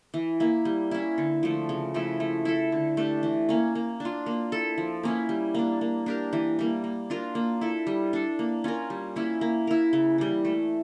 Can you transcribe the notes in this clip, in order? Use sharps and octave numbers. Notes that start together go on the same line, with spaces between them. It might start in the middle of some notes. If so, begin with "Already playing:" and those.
E3
A#3 E4
G3
C#4 E4
D3
F3 A3
C#3
F3 A3 E4
A3
E4 A4
D3
A3 D4 G4
E3
A#3 C#4
A#3
D4
F4
A#3
E4 A4
F3
A#3 C#4 E4
G3
A#3 D4
A#3
D4 G4 A#4
E3
G3 A#3
A#3
D4 F4 A#4
A#3
E4 A4
G3
D4 A4
A#3
C#4 F4 A#4
G3
A#3 C#4 E4
A#3
E4 A#4
C#3
E3 G3
A3